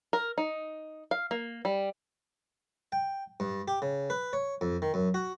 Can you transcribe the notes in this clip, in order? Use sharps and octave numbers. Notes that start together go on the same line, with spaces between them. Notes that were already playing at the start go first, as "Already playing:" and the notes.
A#4
D#4
F5
A#3
G3
G5
G2
G4
C#3
B4
C#5
F2
D#3
F#2
F#4